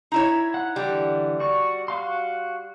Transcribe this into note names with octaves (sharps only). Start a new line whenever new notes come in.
D#4 E4 C#5
F#5
D3 E3 G3 F#5
F#4 D5 C#6
F#4 F5 C6